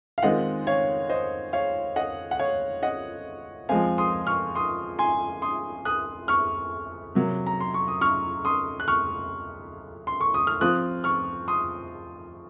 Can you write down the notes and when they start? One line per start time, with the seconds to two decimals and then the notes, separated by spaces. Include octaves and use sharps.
0.18 F5
0.23 D#3 G#3 C4 F4 D#5 F#5
0.67 C#5 F5
1.09 C5 D#5
1.53 C#5 F5
1.96 D#5 F#5
2.31 F#5
2.39 C#5 F5
2.83 D#5 F#5
3.69 F3 G#3 C4 F5 G#5
3.98 C6 D#6
4.27 C#6 F6
4.55 C6 D#6
4.99 G#5 C6
5.42 C6 D#6
5.85 D#6 F#6
6.28 C#6 F6
7.15 C3 F#3 A#3
7.47 A#5
7.60 C6
7.74 C#6
7.88 D#6
8.01 C#6 F6
8.45 C6 D#6
8.80 F#6
8.88 C#6 F6
10.07 C6
10.21 C#6
10.34 D#6
10.47 F6
10.61 F3 C4 F4 D#6 F#6
11.04 C#6 F6
11.48 C6 D#6